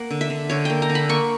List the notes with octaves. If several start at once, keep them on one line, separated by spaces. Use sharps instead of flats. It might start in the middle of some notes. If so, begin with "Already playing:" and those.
Already playing: A#3 F#5
D3
E5
D3
D3 C#5
A#3 G5
A#5
D3
B5
A#3 C#6